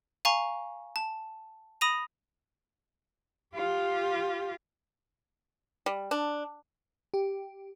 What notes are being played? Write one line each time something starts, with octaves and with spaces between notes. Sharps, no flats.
F5 G#5 A#5 C#6
A5
B5 D#6 A#6 D#7 F7
F4 G4
G3
D4
G4